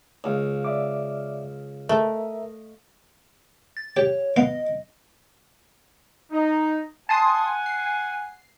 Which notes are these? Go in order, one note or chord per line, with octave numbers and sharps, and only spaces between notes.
C#2 D#5 F5
D5 E5 D6
A3 A#4 D#5 E5
A6
G4 C#5
B3 D#5 F5
D#4
F#5 G#5 A5 C6 D#6
C7